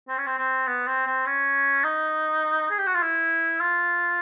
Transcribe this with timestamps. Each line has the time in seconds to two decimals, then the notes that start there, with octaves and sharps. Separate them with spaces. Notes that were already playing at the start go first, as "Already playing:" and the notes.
0.09 C4
0.18 C#4
0.27 C4
0.38 C4
0.67 B3
0.87 C4
1.07 C4
1.26 C#4
1.84 D#4
2.71 G#4
2.78 G4
2.87 F#4
2.95 F4
3.02 E4
3.61 F4